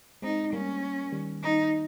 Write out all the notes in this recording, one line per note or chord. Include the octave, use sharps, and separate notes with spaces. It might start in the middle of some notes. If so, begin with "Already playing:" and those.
G#3 C4 D#4
G3 A#3 C#4
D#3 G3
D#4